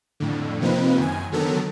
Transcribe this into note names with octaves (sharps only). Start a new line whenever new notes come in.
F2 A2 D3
C3 F3 A#3 C4 D#4 B4
F#2 D#3 G#5
D3 D#3 F#3 B3 A4 A#4